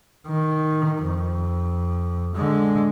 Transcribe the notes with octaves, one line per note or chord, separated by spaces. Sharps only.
D#3
F2
D3 G#3